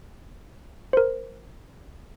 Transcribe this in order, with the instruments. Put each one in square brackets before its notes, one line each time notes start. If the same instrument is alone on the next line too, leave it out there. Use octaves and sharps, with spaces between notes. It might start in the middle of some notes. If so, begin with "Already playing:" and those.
[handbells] A#4 C5